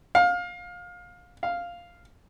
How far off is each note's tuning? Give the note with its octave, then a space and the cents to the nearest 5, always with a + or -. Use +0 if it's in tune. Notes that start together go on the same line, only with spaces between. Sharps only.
F5 +25
F5 +0